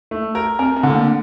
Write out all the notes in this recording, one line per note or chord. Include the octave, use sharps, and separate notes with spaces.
A3
A#4
C4 A#4
C4
D3
A3
A#3